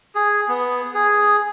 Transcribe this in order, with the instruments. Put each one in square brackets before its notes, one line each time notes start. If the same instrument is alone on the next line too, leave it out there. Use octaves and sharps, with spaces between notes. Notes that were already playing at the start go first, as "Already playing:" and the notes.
[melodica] G#4
B3
G#4